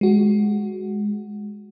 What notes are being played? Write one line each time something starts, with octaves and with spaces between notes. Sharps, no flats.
G#3 F#4